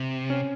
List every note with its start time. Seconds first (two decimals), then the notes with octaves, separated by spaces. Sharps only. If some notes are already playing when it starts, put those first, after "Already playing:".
Already playing: C3
0.30 C#4